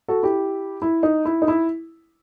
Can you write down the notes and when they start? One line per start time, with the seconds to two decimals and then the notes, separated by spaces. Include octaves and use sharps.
0.08 F#4 A4
0.23 E4 G4
0.82 E4
1.03 D#4
1.25 E4
1.42 D#4
1.48 E4